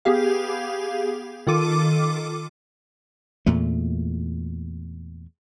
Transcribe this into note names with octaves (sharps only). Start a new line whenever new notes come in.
B3 G4 G#4 F5
D#3 F4 A4 D6 D#7
E2 A#2 A3